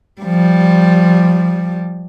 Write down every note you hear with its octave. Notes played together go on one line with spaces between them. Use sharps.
F3 G3